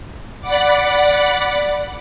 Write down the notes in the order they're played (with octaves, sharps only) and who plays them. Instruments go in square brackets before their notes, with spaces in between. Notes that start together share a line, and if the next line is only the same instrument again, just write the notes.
[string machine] D5 F#5 B5